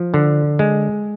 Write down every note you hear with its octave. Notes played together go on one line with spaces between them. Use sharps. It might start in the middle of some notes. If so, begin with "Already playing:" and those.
Already playing: F3
D3
G#3